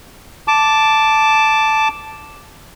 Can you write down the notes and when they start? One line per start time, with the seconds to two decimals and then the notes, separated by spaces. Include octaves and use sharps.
0.48 A5 D6